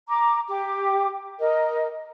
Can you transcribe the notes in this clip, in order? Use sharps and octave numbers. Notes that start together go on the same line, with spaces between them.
A#5 D6
G4 D6
A#4 D#5